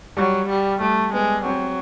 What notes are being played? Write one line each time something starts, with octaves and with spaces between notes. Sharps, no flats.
F#3 G3
G3
G3 A3
G#3 B3
F#3 C4